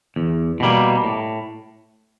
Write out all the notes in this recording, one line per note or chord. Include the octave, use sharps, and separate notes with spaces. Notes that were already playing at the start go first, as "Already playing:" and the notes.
E2
B2 G3 A#3
A2